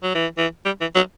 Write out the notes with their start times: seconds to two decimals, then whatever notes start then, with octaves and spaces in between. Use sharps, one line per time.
0.03 F#3
0.15 E3
0.38 E3
0.65 G3
0.81 E3
0.95 F#3